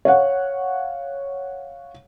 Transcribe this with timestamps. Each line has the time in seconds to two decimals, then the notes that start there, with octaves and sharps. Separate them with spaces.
0.05 C#5 F5 F#5